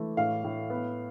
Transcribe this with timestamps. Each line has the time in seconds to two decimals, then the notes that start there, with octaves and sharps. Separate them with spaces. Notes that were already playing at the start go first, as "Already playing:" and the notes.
Already playing: E3 A3
0.17 A2 F5
0.44 A2
0.70 B3